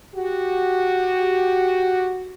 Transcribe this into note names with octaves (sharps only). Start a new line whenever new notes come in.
F#4 G4